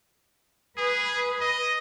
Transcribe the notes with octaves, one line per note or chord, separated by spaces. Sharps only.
G#4 B4
D#5